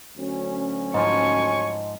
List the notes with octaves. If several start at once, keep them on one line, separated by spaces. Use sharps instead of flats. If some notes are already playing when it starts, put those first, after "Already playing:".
D2 F#3 C#4
G#2 F3 D#5 G#5 A5 C#6